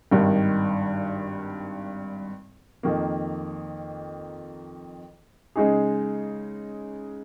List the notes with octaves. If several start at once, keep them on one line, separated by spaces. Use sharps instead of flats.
G#1 G2 D#3
F2 D#3 A#3
C#3 G#3 D#4 G#4